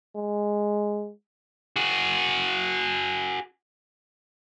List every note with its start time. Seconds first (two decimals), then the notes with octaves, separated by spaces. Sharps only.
0.15 G#3
1.76 F#4 G#4